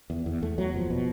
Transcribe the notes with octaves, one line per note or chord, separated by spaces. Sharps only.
E2
E2
E2 A3
E2 F#3
F#1 F3
B2